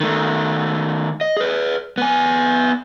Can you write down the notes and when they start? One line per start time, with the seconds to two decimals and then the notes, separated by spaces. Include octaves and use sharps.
0.01 D#3 A3
1.21 D#5
1.37 G#4 B4
1.98 B3 G#5